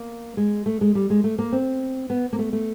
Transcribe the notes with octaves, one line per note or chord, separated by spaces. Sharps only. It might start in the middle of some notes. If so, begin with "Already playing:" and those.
Already playing: A#3
G#3
A3
G#3
G3
G#3
A3
A#3
C4
B3
A#3
A3
A3